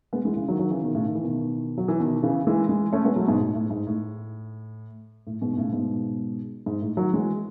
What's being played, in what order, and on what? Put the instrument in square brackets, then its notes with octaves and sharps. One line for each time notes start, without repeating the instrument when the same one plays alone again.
[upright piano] G#3 B3
E3 G#3
C#3 E3
D#3 F#3
D#3 F#3
C#3 E3
B2 D#3
A2 C#3
D#3
E3
B2 D#3
F#3
E3
B2 D#3
C#3 E3
E3 G#3
E3 G#3
A3 C#4
G#3 B3
F#3 A3
G#2 B2
A2
A2
G#2
A2
A2
G#2 B2
B2
A2 C#3
G#2 B2
G#2
A2
D#3 F#3
E3 G#3